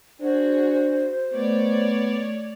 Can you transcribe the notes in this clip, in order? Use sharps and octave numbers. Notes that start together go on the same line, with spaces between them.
D4 F#4 G#4 C5
A3 B3 C#5 D5